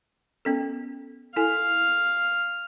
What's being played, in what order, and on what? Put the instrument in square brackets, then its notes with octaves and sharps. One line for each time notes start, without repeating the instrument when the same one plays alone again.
[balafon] B3 C#4 A4
[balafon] E4 A4 G#5 [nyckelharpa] F5